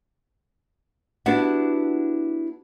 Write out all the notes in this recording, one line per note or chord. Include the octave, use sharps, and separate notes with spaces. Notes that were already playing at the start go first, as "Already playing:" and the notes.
B3 D4 E4 F#4 G4 F#5